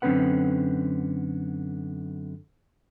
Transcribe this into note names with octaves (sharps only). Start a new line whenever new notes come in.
F#2 D3 C4 C#4 B4 F#5